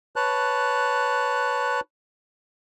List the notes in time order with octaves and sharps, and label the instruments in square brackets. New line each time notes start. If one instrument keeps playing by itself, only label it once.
[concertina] B4 C#5 A5 F#6